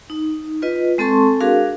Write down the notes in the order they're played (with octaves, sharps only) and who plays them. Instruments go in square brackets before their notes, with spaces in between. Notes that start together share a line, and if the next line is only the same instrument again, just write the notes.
[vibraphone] D#4
F4 B4 D#5
G#3 C4 A4 A5 C6 C#6
D4 F#4 G#4 A#4 F5